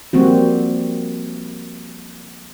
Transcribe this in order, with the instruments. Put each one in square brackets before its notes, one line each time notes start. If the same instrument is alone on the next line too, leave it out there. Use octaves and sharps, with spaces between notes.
[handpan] F3 G3 A#3 C4 F#4